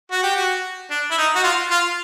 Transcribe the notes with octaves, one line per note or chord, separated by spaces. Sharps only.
F#4
G4
F#4
D4
E4
D#4
F#4
F4
F4